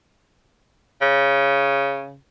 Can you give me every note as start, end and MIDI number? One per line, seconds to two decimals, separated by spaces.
1.01 2.16 49